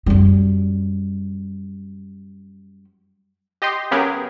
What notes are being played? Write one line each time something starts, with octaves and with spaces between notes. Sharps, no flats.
F#2 G3
G4 D#5 G5 C6
C#3 F#3 B3 G4 G#4 A#4